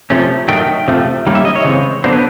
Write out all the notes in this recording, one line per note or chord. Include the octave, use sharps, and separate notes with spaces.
C3 F3 A3 C#4
D#3 F#3 A3 G5
C3 F3 A3
D#3 G3 A#3 C#4
E5
D#5
C#5
C#3 E3 G#3 C4
D3 F#3 B3 D4 C5
B4